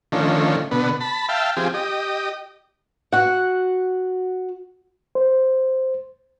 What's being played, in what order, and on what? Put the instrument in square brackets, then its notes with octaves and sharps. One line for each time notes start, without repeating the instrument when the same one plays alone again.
[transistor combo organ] D3 D#3 F3 A3 C#4
B2 D3 B3
A5 B5
E5 F5 G5 A5
F3 C4 G4 G#4
G4 D#5
[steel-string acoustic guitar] F#4 F#5
[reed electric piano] C5